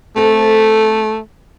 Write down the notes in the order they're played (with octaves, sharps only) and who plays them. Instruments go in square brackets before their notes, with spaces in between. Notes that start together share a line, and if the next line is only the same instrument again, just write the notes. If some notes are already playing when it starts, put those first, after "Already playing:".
[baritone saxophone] A3 [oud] C4 A4